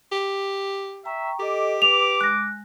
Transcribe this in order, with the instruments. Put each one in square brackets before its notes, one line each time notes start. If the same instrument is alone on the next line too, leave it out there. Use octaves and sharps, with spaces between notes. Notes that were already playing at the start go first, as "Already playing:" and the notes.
[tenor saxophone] G4
[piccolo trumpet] E5 [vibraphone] G5 A#5 C#6
[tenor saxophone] G4 [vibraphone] A4 D#5 [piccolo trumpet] D6
[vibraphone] B4 [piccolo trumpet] D6 [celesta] F7
[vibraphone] G#3 [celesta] F#6 A#6